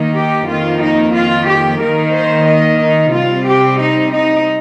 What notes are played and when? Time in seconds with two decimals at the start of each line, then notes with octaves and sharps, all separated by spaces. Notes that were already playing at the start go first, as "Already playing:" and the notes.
Already playing: D#3 A#3 D#4
0.15 G4
0.48 F2 D#3 A#3 F4
0.81 D#4
1.14 F4
1.47 G4
1.80 D#3 A#3 D#4 A#4
2.14 C5
2.47 D#5
2.80 D#4
3.13 C3 G3 C4 F4
3.46 G4
3.80 D#4
4.13 D#4